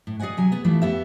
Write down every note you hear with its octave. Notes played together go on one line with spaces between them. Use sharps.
A2
G#4 D5 D#5 F#5 G#5
C3 F#3 G#5
B3 G#4
E3 F3 G3 A3 B3 E4
F2 B3 G4 E5